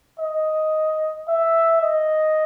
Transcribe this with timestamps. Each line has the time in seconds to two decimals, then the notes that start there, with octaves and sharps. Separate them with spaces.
0.19 D#5
1.28 E5
1.82 D#5